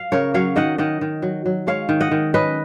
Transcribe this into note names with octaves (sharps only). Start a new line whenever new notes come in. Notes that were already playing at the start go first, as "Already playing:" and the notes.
Already playing: F5
C#3 A#4 C#5
F#3 C#5 F5
D#3 D#5 F#5
D#3 D#5 F#5
D#3
F#3
F#3
G#3 C#5 F5
D#3
D#5 F#5
D#3
C#4 B4 D#5